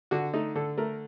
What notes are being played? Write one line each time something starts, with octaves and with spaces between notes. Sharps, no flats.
D3 F#4
A3 D#4
D3 A4
A3 A#4